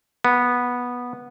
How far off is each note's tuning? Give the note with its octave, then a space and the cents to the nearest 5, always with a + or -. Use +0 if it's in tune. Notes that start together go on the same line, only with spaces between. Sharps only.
B3 -10